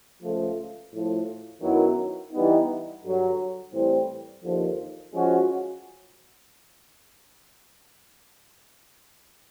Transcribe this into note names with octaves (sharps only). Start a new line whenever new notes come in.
C#2 C#3 F3 A3
A2 F3 A3
F#2 D#3 F#3 B3 E4
E3 G3 B3 D#4
G2 D3 F#3
A2 E3 G3 C4
D#2 D3 F3
F3 G#3 C#4 F#4